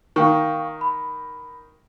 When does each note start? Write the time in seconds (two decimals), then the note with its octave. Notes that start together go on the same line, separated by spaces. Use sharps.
0.16 D#3 F5 G5 C#6
0.81 B5